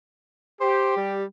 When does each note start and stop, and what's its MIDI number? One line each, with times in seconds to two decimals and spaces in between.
0.61 1.14 67
0.61 0.93 72
0.97 1.24 55